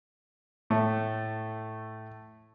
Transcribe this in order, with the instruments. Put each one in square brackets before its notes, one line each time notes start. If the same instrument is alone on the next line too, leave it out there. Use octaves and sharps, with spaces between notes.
[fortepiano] A2 A3